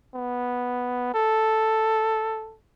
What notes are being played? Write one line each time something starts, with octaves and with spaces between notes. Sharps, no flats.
B3
A4